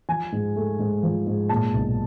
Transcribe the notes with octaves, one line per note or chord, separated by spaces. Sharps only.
F3 G#5
G#2
A3
G#2
F3
G#2
A#2 A5
B1